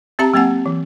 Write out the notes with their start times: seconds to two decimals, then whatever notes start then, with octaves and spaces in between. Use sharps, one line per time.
0.19 C4 G4 E5 A5 A#5
0.34 F#3 A#3 C4 F#5 G#5
0.66 E3